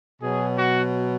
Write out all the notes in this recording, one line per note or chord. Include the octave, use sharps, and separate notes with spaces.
B2 F#3 G#4
F#4